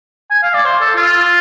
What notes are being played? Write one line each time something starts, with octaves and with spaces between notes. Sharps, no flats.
G#5
F5
D5
C5
A4
F4